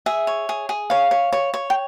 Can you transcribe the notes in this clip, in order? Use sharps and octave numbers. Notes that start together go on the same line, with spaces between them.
G#4 E5
C#5
G#4
G#4
C#5 F5
C#5
C#5
C#5
G5